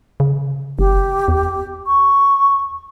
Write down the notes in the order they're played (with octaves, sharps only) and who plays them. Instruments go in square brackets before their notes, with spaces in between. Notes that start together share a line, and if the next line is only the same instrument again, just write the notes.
[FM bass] C#3
[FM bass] F#1 [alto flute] G4
[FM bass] E2
[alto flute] C#6